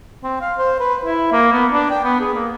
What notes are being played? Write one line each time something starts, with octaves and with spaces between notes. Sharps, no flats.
C4
F5
C5
B4
E4
A#3
B3
D4
G5
B3
G#4
A#3